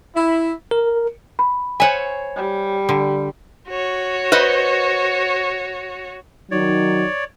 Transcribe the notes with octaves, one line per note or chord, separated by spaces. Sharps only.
E4
A#4
B5
C5 C#5 E5 F#5 G#5
G3
D3
F#4 C#5
B4 C5 D#5
D#3 F#3 D#4 C#5 D5